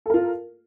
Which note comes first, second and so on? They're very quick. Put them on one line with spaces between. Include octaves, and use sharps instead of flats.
A4 A#4 F4